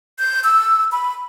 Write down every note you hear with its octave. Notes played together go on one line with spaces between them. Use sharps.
G6
E6
B5